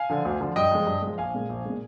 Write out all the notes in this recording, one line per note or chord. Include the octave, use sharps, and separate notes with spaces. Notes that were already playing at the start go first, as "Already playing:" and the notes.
Already playing: F5 G#5
D3 F3
D2
D3 F3
G2 D#5 G5
F3 G#3
G2
F3 G#3
A#1 F5 G#5
A#2 G#3
A#1
A#2 G#3